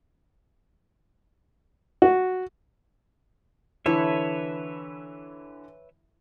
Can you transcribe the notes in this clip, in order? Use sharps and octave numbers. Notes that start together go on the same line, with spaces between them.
F#4
D3 E3 E4 A4 B4 C#5 E5